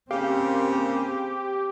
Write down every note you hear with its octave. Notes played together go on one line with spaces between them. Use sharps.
C#3 A#3 C4 G4 F5